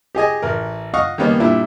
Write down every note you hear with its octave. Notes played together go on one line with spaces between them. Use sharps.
G4 G#4 D#5 G#5
A1 A#4
D#5 F5 F#5 C#6 D#6 F6
D#3 G3 A#3 B3 C#4 D#4
A#2 G3 D4 E4